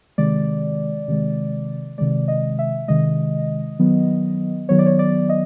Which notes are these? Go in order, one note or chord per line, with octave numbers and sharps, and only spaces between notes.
C3 D#3 G#3 D5
C3 D#3 G#3
C3 D#3 G#3 D5
D#5
E5
C3 D#3 G#3 D#5
D#3 F#3 B3
D#3 F#3 B3 C#5
D5
C#5
D5
D#5